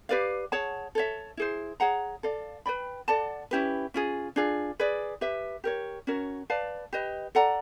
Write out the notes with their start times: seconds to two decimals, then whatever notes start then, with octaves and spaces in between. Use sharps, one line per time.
0.09 G4 B4 D5 F5
0.52 G#4 C#5 F#5 A5
0.95 A4 C#5 E5
1.37 E4 G#4 C5
1.80 G#4 C#5 F#5 A#5
2.23 A4 D5 F5
2.66 B4 D5 G5 B5
3.08 A4 D5 F#5 A5
3.51 C#4 E4 G4 B4
3.94 C#4 F4 G#4
4.36 D4 F4 G#4
4.79 G#4 B4 D5
5.21 G4 B4 E5
5.64 G4 A#4 C#5
6.07 C#4 F#4 A#4 C#5
6.50 B4 D5 F5 A5
6.93 G4 B4 D#5
7.35 A4 D5 F#5 A#5